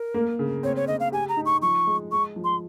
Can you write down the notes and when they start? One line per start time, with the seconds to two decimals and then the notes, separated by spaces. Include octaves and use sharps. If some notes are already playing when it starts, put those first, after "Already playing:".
Already playing: A#4
0.14 A#3
0.39 C#3
0.63 C4 C#5
0.76 C#5
0.87 C#3 D#5
1.00 F5
1.12 G4 G#5
1.29 A#5
1.37 D#4
1.45 C#6
1.62 F3 C#6
1.87 G#3
2.11 G#3 C#6
2.36 F3
2.44 C6